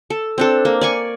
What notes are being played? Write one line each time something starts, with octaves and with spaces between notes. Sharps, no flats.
A4
C4 D4 A4
A#3
D5 G#5 C#6